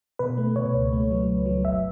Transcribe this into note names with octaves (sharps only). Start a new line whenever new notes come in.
B2 B4
A3
B2 C#5
C#2
A3
F#3
C#2
F#3
G1 E5